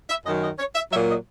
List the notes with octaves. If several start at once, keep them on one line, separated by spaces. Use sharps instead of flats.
E5
F#2 D#3 F#3 D#5
D#5
C#5
E5
A#2 F#3 E5
D#5